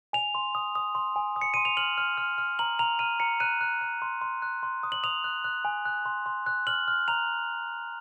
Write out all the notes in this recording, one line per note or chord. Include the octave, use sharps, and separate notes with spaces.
G#5 F7
C6
D#6
D#6
C6
G#5
D#6
C#7
C6 D#7
F7
F6 F#7
F6
F6
F6
A#5 F#7
A#5 F7
F6 D#7
A#5 C#7
F#6 D#7
F#6
F#6
C6
C6
F#6
C6
D#6
F#7
D#6 F7
F#6
F#6
G#5
F#6
C6
C6
F#6
F6 F#7
F6
A#5 F7